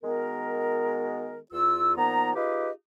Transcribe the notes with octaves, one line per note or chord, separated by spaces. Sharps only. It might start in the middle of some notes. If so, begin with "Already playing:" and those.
D#3 G#3 B3 F#4 A#4
E2 F4 E6
A#2 F3 B3 D#4 A#5
D#4 F4 G4 G#4 B4 D#5